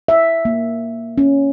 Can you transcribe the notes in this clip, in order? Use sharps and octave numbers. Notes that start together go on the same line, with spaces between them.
E5
A#3
C#4